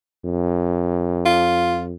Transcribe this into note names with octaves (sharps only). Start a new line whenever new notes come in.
F2
F4